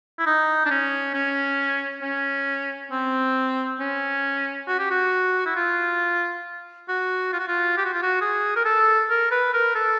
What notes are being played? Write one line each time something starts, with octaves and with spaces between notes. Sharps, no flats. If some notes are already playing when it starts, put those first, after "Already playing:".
E4
D#4
D4
C#4
C#4
C#4
C4
C#4
F#4
G4
F#4
E4
F4
F#4
F4
F#4
F4
G4
F#4
F4
F#4
G#4
A#4
A4
A#4
B4
A#4
A4